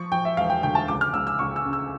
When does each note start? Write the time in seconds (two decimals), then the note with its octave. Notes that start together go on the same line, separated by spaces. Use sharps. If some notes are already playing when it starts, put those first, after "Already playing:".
Already playing: F3 C#6
0.12 F3 G5
0.25 E5
0.37 E1 F5
0.50 G5
0.63 D2 G5
0.75 A5
0.88 C#2 D6
1.01 F6
1.13 C#2 E6
1.27 E6
1.39 C#2 C#6
1.56 E6
1.65 C#3
1.73 E6